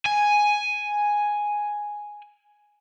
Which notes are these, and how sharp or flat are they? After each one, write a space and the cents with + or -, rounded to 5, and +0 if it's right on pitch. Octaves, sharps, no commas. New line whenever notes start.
G#5 +0